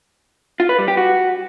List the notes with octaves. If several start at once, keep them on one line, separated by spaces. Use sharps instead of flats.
F4
B4
G3
G4
F#4